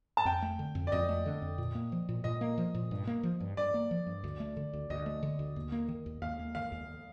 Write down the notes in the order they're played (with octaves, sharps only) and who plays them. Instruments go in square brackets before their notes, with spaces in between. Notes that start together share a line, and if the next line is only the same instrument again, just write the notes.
[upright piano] A5
[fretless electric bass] F2 [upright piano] G5
[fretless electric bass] A3
D3
F2
[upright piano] D5
[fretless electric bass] F2 [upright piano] D#5
[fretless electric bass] A3
D3
F2
A#2
A#3
F3
A#2
[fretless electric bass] A#2 [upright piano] D#5
[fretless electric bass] A#3
F3
A#2
G2
A#3
F3
G2
[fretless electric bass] G2 [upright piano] D5
[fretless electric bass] A#3
F3
G2
D2
A3
D3
D2
[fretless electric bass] D2 [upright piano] D#5
[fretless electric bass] A3
D3
D2
D#2
A#3
D#3
D#2
[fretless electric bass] D#2 [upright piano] F5
[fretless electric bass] A#3
[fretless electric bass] D#3 [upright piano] F5
[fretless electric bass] D#2